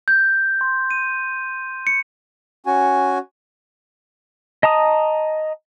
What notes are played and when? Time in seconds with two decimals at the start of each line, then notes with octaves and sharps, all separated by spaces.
0.08 G6
0.61 C6
0.91 D#7
1.87 C#7
2.66 C#4 F#4 G#5
4.63 D#5 A5 A#5 D#6